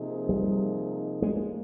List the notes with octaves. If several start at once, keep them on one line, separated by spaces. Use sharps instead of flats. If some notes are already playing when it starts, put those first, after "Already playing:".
Already playing: C3 F3 A#3 D#4 G#4
G3
A2 F3 G#3 A#3